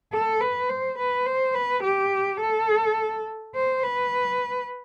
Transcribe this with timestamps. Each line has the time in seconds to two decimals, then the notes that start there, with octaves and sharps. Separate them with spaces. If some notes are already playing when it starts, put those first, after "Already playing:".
0.12 A4
0.41 B4
0.69 C5
0.99 B4
1.26 C5
1.55 B4
1.84 G4
2.41 A4
3.55 C5
3.83 B4